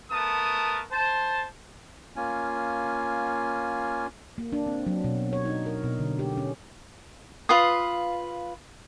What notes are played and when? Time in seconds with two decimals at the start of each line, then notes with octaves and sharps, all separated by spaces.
0.10 A3 B3 A#4 A5 D#6
0.91 C5 A5
2.16 A#3 C#4 F4 G#5
4.38 A#3
4.53 D4
4.67 C4
4.87 F#3
5.04 B2
5.33 C#5
5.45 D#4
5.66 A#4
5.84 B2
5.99 D3
6.19 G4
6.37 C#4
7.49 F4 B4 F5 D#6